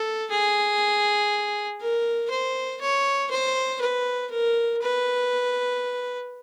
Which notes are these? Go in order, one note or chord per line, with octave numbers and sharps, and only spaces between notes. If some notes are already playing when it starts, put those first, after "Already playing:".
Already playing: A4
G#4
A#4
C5
C#5
C5
B4
A#4
B4